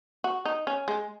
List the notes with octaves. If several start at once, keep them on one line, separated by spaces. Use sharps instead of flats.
F#4
D#4
C#4
G#3